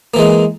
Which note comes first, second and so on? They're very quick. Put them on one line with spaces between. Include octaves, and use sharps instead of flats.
A#3 E3 G#3